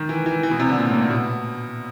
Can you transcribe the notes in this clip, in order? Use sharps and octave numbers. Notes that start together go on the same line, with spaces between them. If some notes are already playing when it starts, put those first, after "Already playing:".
Already playing: D#3
E3
E3
E3
B2
C3
D3
A#2
A2
A#2
A#2
B2